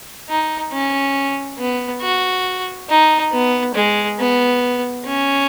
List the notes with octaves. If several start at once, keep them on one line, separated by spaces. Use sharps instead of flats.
D#4
C#4
B3
F#4
D#4
B3
G#3
B3
C#4